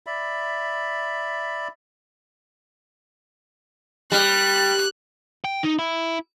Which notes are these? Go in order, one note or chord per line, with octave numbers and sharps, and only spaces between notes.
D5 E5 B5
G3 F#6
G5
D#4
E4